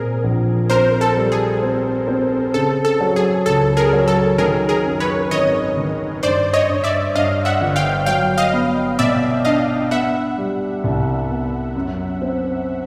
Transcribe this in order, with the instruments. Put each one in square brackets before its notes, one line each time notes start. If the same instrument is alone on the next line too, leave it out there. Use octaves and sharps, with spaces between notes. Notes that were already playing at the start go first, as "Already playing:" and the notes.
Already playing: [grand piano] A#2 C4 [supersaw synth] G#4 A#4
[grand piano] A#1
[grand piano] C4 [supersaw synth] A#4 C5
[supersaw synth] A4
[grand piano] G3
[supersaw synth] G#4
[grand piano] C4
C4
[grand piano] C#3 [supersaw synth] A4
[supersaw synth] A4
[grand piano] F#3
[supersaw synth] G#4
[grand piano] C#2 [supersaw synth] A4
[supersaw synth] G#4 A#4
[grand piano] F#3
[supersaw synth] A4
[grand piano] D#3 [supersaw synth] G#4 A#4
[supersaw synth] G#4 A#4
[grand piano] F#2
[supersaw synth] B4 C#5
[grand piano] G#1 [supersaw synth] C#5 D#5
[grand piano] D#3
[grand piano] G2 [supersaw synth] C5 D5
[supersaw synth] C#5 D#5
[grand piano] G2
[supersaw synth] D5 E5
[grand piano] G2 [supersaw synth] D#5 F5
[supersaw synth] E5 F#5
[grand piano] G1
[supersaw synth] F5 G5
[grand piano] F#3 [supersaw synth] F5 G5
[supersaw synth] D#5 F5
[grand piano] B3
[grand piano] B2 [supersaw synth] D5 E5
[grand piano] D4 [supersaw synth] D#5 F5
[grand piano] B3 [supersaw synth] E5 F#5
[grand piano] G3
C2
B3
F#2
C4